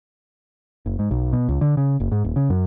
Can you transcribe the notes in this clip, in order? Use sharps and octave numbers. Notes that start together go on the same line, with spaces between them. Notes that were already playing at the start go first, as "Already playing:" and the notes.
F#1
G#2
B1
B2
C#2
D3
C#3
F#1
G#2
D#1
C#3
F#2